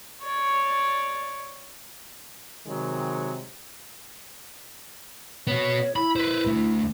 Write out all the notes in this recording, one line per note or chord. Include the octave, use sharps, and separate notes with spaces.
C#5 D5
C3 D#3 F#3 G#3
B3 F#4 C#5
E4 B5
B4 C5
D2 A3